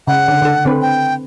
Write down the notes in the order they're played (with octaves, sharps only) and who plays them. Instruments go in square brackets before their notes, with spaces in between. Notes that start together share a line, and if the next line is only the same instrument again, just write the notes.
[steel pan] C#3 [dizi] F#5
[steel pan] D3
D3 A4
D3 C4 B4
[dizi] G5